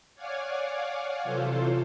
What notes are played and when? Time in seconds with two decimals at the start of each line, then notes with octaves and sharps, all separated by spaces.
0.15 C#5 D5 F5 F#5 G#5 D6
1.23 C3 E3 F#3 F4 A4 C5